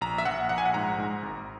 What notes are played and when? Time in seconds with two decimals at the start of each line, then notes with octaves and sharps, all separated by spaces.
0.01 A#1 A#5
0.18 E5
0.25 A#1 F#5
0.49 A#1 F#5
0.58 G#5
0.65 F#5
0.74 G#2 A#5
0.98 G#2
1.23 G#1